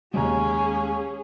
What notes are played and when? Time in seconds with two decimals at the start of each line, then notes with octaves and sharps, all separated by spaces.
0.14 D#2 G#3 C#4 G4 G#4 C#5 A#5